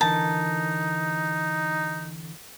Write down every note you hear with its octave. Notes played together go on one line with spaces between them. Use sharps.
D3 E3 D#4 A#4 A5